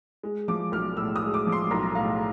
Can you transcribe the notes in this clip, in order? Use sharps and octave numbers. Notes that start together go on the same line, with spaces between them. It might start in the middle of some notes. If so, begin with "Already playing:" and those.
G#3
F3 D6
B1 F6
A2 E6
D#6
G#3
D6
F3
C6
B1 A#5
A2 F5